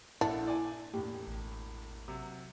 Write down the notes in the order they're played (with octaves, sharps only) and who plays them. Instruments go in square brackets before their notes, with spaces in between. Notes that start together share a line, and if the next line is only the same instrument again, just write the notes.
[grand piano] A#1 A4 F#5 [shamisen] D4 [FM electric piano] E4
[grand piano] D5 G#5
[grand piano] E1 A2 [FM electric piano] G4
[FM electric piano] A1
[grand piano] C3 F#3